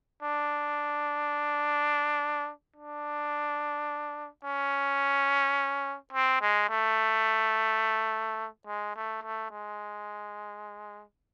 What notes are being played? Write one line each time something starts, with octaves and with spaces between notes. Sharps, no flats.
D4
D4
C#4
C4
G#3
A3
G#3
A3
A3
G#3